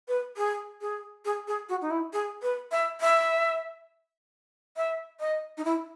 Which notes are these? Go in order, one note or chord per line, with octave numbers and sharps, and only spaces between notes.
B4
G#4
G#4
G#4
G#4
F#4
D#4
E4
G#4
B4
E5
E5
E5
D#5
D#4
E4